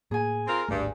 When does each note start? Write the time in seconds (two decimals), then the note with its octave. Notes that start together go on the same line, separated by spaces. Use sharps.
0.11 A2 A#3 G#4 G#5
0.47 C4 F4 A#4
0.69 D1 G#1 G2 A3